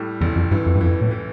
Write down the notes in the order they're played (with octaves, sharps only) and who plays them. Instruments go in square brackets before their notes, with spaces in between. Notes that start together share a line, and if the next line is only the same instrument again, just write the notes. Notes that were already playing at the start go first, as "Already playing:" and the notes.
Already playing: [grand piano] A2 G3
[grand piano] A1 [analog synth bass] E2
[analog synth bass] F2
[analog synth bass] G2 [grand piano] E3
[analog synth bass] F2
G2
[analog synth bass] F2 [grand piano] E3
[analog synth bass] A2
[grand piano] E3